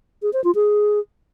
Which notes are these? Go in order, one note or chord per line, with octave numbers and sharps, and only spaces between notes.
G#4
C5
F4
G#4